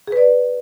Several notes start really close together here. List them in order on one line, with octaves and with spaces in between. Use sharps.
G#4 B4 D5